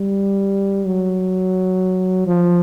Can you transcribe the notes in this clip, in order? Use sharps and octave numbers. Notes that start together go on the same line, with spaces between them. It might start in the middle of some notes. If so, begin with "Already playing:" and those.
Already playing: G3
F#3
F3